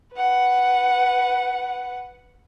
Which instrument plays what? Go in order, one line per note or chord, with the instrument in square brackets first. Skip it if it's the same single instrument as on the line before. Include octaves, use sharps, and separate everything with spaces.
[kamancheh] B4 F#5